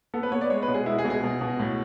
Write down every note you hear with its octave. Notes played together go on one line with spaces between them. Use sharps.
B3 A4
B4
B3 C#5
D5
G#3 C#5
B4
B2
G#4
G#3 E4
G#4
B2
G#4
B2
B2
A2